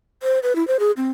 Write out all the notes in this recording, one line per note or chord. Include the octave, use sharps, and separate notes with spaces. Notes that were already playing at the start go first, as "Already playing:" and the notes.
C5
B4
E4
C5
G#4
C4